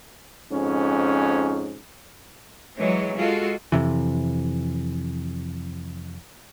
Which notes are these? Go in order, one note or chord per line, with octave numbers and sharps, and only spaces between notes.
F2 G#2 C#4
E3 F#3 G#3 C#5
G#3 F4 F#4 A4
F2 C3 E3